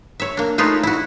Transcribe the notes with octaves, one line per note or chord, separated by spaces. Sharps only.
C#5 E5
A#3 D4
A3 D#4 F4 G#4 B4 C#5
E4 F#4